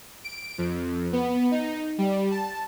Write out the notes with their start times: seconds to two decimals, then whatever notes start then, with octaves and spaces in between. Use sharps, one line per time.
0.24 D7
0.58 F2
1.13 B3
1.51 D#4
1.98 G3
2.31 A5